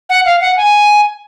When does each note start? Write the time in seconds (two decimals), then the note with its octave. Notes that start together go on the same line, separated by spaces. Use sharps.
0.09 F#5
0.25 F5
0.41 F#5
0.57 G#5